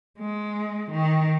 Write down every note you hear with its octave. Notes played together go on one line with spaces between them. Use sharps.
G#3
D#3